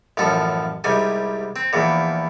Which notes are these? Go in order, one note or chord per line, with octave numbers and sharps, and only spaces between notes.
A1 F#2 F3 A4
C2 G#2 G3 G#5
C4
A#1 E2 A#2